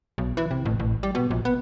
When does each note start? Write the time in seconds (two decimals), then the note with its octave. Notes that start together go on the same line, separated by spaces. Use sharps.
0.18 B1
0.37 E3
0.51 C3
0.65 A1
0.80 A1
1.03 G3
1.15 B2
1.31 A#1
1.45 B3